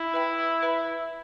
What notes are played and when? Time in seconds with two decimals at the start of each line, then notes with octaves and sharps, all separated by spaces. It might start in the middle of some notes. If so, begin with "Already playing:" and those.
Already playing: E4
0.14 B4 E5 G5 B5
0.63 B4 E5 B5